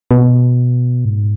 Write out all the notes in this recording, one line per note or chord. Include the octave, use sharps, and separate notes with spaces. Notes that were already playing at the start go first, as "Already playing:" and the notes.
B2
G#2